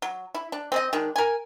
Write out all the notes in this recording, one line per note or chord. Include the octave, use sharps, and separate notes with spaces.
F#3
E4
D4
C4 G#4 D#5
D#3 G#3 D4
A#4 G#5